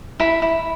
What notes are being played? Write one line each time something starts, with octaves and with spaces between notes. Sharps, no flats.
E4 B5
E4